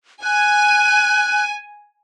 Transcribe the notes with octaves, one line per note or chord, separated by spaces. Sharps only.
G#5 F#6